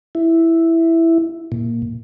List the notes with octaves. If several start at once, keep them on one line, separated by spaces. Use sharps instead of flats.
E4
A#2